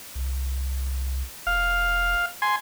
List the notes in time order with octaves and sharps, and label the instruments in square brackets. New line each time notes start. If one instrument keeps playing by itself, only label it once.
[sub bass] C2
[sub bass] F1 [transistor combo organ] F5
[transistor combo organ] G#5 C6